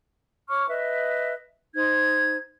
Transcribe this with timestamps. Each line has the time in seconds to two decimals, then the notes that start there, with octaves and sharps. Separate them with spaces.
0.49 C#5 C#6 D6 F6
0.68 B4 D#5 E5
1.75 D#4 C5 G#6